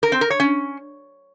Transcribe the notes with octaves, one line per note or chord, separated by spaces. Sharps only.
A#4
C4
A#4
C#5
C#4